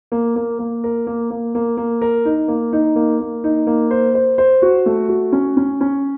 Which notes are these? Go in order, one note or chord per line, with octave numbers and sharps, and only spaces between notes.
A#3
A#3
A#3
A#4
A#3
A#3
A#3
A#3
A#4
D#4
A#3
D#4
A#3
A#3
D#4
A#3
C5
C5
C5
F#4
A3
F#4
C#4
C#4
C#4